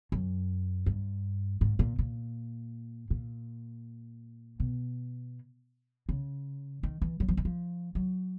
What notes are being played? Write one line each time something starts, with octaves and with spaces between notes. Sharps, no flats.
F#2
G2
G#2
A#2
A#2
A#2
B2
C#3
D#3
E3
F#3
F3
E3
F3
F#3